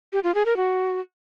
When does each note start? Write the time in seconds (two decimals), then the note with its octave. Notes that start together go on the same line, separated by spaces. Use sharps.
0.13 G4
0.24 F4
0.35 G#4
0.45 A#4
0.56 F#4